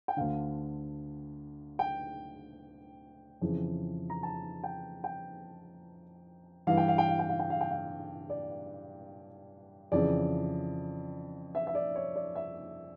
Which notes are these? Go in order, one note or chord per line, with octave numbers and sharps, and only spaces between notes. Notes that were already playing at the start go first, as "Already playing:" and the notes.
G5
D2 D3 F5
G5
F2 C#3 E3
A#5
A5
G5
G5
G2 E3 F5
G5
F5
G5
F5
G5
F5
G5
F5
G5
F5
D5
F2 C#3 E3 D5
E5
E5
D5
C#5
D5
E5